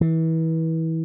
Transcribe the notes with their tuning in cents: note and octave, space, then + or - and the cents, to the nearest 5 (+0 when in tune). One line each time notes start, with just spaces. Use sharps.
E3 -30